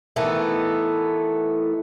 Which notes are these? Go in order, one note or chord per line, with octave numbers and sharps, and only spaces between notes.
D#3 E3 A3 B3